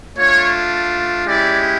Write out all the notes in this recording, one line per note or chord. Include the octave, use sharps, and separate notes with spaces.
A3 D4 F4 C#5
G#3 C#4 E4 G4 D5